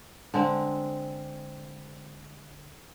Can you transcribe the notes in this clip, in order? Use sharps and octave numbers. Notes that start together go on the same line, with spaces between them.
D3 G#3 C4